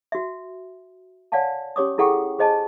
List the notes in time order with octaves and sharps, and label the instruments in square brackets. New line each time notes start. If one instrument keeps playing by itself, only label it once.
[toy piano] F#4 E5
C#5 D5 F5 F#5 G#5 A5
C#4 G4 C#5 D6 D#6
E4 G#4 A4 F#5 G5 C#6
G#4 C5 D#5 G#5 A5